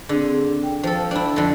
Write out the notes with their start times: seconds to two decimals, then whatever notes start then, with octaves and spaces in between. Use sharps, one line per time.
0.09 D3 C4 D4 G#4
0.63 G5
0.83 F3 A4
1.11 D4 E4
1.36 F2 D3